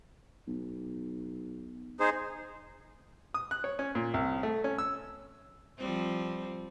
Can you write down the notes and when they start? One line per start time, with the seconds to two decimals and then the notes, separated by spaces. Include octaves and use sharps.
0.48 B1
2.00 D#4 G#4 C5
3.34 D#6
3.51 F#6
3.64 C#5
3.79 C#4
3.95 A#2
4.14 C2
4.43 A3
4.64 C#4
4.78 E6
5.79 F3 G3 C4